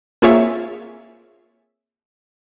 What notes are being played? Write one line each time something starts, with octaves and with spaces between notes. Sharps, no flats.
A#3 C4 F4 G#4 C#5 E5